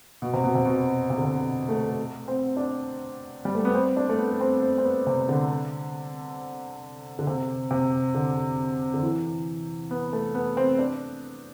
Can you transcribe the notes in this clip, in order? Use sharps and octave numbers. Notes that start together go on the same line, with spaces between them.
B2
C3
B2
C3
B2
C3
D3
C3
A3
C4
D4
G3
A3
B3
C4
D4
A3
B3
C4
C4
C4
B3
C3
D3
D3
C3
C3
D3
D3
E3
B3
A3
B3
C4
D4